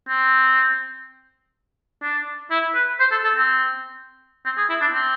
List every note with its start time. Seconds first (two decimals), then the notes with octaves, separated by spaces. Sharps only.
0.08 C4
2.03 D4
2.51 E4
2.75 B4
2.99 C5
3.11 A4
3.24 A4
3.36 C4
4.45 C4
4.57 G#4
4.69 E4
4.81 D4
4.93 C4